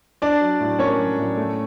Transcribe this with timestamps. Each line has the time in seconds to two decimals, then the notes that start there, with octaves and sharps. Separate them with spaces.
0.22 D4 D5
0.41 F#3
0.60 A2
0.79 A#3 C#4 C#5
0.99 F#3
1.18 A2
1.37 A3